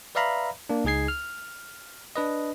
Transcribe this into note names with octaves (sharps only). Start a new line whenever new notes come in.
B4 D5 E5 F5 A#5 B5
A#3 D4
C#2 D#4 G#4 G#6 C7
F6
D4 B4 D#5